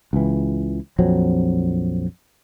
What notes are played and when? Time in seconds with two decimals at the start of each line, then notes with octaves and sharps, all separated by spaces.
0.13 C#2 E3
0.99 A#1 F2 F#3 C4